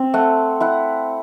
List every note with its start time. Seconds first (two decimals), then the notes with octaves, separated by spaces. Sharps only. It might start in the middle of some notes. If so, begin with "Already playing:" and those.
Already playing: C4
0.14 A3 F#5
0.60 E4 F#5